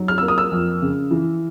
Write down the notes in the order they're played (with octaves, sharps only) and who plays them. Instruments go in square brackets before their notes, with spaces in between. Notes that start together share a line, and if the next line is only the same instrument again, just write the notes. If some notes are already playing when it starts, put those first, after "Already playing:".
Already playing: [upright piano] F#3 D#4
F6
A#3 E6
D#6
E6
F2
C#3
E3